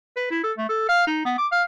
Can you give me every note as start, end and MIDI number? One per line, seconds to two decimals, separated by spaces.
0.17 0.27 71
0.31 0.42 64
0.43 0.53 69
0.57 0.66 57
0.69 0.84 69
0.89 1.04 77
1.07 1.25 63
1.25 1.35 59
1.38 1.47 86
1.52 1.63 77